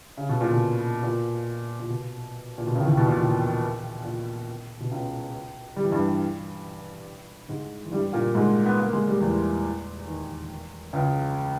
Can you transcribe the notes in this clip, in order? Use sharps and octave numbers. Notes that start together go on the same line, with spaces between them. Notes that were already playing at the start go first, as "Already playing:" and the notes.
C#3
B2
A#2
B2
A#2
A#2
B2
A#2
B2
C#2 C#3
E3
D#2 D#3
B2
A#2
B2
A#2
B2
C#2 C#3
G3
E3
G2 G3
G#2 G#3
E3
G2 G3
A#2 A#3
G#2 G#3
B3
A#3
G#3
G3
E2 E3
D#2 D#3
C#2 C#3